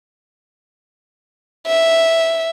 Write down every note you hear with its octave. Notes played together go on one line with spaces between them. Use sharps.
E5